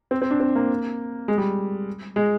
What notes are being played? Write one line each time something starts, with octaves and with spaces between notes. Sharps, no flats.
C4
C4
D4
C4
A#3
G#3
G3
G#3